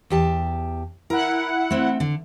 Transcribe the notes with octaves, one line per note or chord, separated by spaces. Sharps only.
E2 G4 A5
E4 A#4 F#5
A3 C4
D3